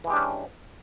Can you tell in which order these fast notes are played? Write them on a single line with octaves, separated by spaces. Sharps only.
E3 G#3 G4 D4 C#4